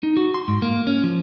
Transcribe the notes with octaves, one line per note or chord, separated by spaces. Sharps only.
D#4
F#4
C6
G#2
A#3
C#4
F3